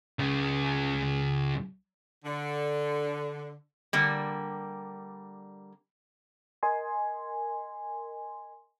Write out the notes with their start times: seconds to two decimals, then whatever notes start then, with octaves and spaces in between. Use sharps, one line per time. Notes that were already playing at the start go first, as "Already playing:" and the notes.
0.19 C#2 C#3
2.25 D3
3.93 D3 G3 A#3
6.63 A#4 D#5 G#5 C6